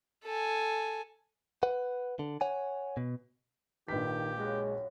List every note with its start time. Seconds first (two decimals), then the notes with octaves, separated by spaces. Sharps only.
0.24 A4 G#5
1.63 B4 F#5
2.19 D3
2.41 C#5 F#5 G#5
2.97 B2
3.88 A#1 D#3 G4 B4 F5 B6
4.38 F#2 C#3 G#3 F#4